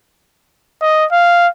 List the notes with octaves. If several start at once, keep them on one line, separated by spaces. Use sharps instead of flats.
D#5
F5